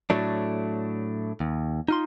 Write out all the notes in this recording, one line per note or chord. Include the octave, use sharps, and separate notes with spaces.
A2 F#3 A3 D4
D#2
D#4 F4 C6